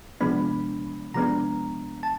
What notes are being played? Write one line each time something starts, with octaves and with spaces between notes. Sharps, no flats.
C3 F3 G#3 B3 D4 B5
C3 F3 G#3 B3 D4 A#5
A5